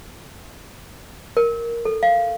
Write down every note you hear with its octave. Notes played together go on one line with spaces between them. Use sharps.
A#4
A4
F5